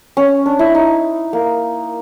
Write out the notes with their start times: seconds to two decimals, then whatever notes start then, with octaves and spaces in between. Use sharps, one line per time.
0.17 C#4
0.46 D4
0.59 E4
0.75 D#4
1.33 A#3